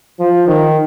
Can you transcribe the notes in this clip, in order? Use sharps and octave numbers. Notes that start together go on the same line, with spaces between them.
F3
D#3